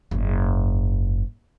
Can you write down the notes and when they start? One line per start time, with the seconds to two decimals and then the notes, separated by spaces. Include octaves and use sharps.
0.11 F#1 G#2